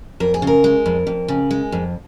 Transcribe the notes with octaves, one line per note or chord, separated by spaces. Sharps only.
F2 A#4
G#4
C#3
A#4
G#3
F2
F2
C#3
G#3
F2